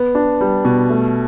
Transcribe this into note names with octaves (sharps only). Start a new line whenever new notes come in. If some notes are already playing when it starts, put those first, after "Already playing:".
Already playing: B3
D4
G3
B2
A3